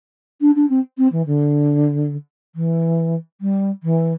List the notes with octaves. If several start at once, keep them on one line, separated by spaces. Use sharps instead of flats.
D4
D4
C4
C4
E3
D3
E3
G3
E3